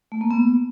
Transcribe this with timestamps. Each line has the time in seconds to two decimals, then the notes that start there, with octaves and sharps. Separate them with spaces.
0.12 A3
0.21 A#3
0.31 B3